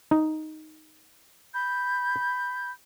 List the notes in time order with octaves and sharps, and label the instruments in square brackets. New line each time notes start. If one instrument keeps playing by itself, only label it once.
[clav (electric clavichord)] D#4
[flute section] B5 G6